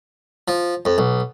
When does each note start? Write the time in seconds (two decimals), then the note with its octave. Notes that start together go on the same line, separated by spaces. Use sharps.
0.48 F3
0.85 F2
0.98 B1